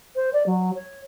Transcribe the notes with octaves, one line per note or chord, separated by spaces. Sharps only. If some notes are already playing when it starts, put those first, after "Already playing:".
C5
D5
F#3
C#5